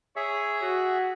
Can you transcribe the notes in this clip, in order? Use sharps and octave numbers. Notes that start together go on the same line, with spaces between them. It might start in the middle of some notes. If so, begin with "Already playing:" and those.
G#4 C#5 E5
F#4